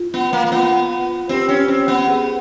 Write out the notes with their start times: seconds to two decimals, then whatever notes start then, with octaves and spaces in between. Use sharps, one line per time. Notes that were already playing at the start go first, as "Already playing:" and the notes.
Already playing: F4
0.14 B3
0.33 A#3
0.47 A#3
0.52 B3 F4
1.29 C4 G4
1.49 C#4
1.68 C4
1.88 B3
2.07 G#4